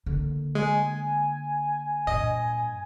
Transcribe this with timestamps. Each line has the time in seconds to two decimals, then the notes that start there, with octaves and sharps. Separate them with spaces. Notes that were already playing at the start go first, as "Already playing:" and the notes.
0.06 D3 A#3
0.55 G#3 G#5
2.07 G2 A#2 D#5